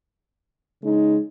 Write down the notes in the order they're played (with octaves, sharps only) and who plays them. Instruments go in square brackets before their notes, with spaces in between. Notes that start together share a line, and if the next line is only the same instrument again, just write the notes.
[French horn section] C#3 G#3 D#4